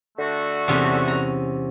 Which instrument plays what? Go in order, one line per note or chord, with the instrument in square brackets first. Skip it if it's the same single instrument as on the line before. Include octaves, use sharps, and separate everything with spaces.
[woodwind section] D3 A3 F#4
[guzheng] E2 C3 C#4
A#5